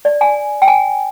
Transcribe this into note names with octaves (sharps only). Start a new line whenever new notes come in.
D5
G#5
G5
G#5